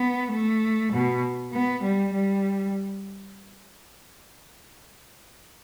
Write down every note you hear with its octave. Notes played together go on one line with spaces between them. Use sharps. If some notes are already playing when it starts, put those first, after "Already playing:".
Already playing: B3
A3
B2
B3
G3
G3